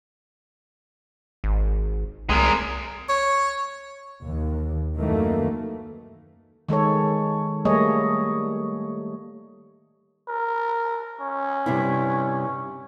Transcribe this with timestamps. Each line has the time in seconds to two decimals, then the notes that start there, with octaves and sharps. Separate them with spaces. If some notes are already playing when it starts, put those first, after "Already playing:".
1.44 G#1
2.30 C2 G#3 A#4
3.09 C#5
4.25 D#2
4.99 F#2 D#3 E3 A3 A#3
6.69 D#3 G#3 A4 C#5
7.65 G3 A3 A#3 G#4 C#5 D#5
10.28 A#4
11.20 C#4
11.66 G2 C3 E4